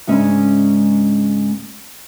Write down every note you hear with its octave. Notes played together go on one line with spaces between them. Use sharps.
G#2 C#3 G#3 C#4 D4 E5